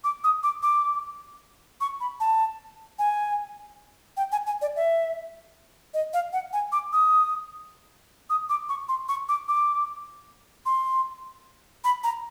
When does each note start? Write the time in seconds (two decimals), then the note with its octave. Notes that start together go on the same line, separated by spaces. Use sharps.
0.04 D6
0.24 D#6
0.43 D6
0.63 D6
1.81 C#6
2.00 B5
2.20 A5
2.99 G#5
4.17 G5
4.32 G#5
4.47 G#5
4.62 D5
4.76 E5
5.94 D#5
6.13 F5
6.33 F#5
6.53 G#5
6.72 D6
6.93 D#6
8.30 D#6
8.50 D6
8.69 C#6
8.89 C6
9.09 C#6
9.29 D6
9.48 D6
10.66 C6
11.84 B5
12.04 A#5